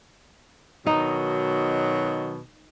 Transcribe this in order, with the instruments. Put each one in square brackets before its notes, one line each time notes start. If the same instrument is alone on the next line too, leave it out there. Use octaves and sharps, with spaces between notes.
[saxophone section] B2 D#3 F#3 [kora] D#4